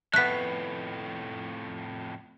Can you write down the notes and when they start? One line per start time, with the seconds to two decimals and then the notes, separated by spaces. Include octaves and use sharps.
0.14 F2 A2 A3 B3 F#6 B6